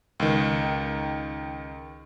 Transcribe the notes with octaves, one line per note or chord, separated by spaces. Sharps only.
C#2 D#3